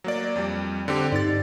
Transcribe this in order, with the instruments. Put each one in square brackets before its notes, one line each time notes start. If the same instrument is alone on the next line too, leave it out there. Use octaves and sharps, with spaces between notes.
[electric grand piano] F#3 A#3 D5
F2 G3
D3 C4 G4
[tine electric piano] G2 D#4 G4 [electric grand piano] D5 A6